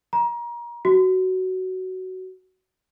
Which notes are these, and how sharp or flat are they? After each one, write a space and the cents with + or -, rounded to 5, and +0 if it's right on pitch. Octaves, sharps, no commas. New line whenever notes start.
A#5 +30
F#4 +15